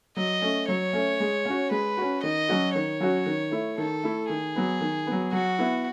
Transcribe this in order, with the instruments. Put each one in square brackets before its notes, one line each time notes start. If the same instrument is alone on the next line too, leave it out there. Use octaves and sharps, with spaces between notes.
[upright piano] F#3 [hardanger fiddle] D#5
[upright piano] A3 C#4
[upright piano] F#3 [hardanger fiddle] C#5
[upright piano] A3 C#4
G#3
C#4 F#4
[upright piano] G#3 [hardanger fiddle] B4
[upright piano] C#4 F#4
[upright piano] D#3 [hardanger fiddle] D#5
[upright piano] F#3 C#4 F#4
[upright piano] D#3 [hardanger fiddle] C#5
[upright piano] F#3 C#4 F#4
D#3
A3 E4
[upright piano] D#3 [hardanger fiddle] A4
[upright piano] A3 E4
[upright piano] D#3 [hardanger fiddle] G#4
[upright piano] F#3 B3
D#3
F#3 B3
[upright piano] F#3 [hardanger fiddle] F#4
[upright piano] B3 E4